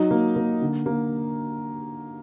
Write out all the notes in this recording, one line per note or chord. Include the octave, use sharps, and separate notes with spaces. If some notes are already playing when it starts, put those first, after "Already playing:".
Already playing: F#3 D#4
A#3
A#3
D3
A#3